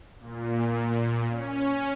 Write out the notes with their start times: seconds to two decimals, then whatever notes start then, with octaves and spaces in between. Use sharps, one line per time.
0.20 A#2
1.30 C#4